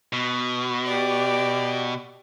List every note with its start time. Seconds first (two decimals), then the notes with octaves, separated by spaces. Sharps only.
0.13 B2
0.86 G4 D5